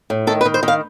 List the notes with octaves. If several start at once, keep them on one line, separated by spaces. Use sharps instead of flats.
A2
D#3 A4
B4
D#3
C5
D#3
F5